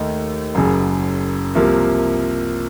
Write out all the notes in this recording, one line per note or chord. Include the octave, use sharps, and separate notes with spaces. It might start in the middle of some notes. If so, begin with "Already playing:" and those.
Already playing: D#2 D#3 A3 D#4
F#1 F#2 C#3
C2 C3 F3 A#3